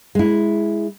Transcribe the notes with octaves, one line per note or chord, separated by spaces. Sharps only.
G#3 E4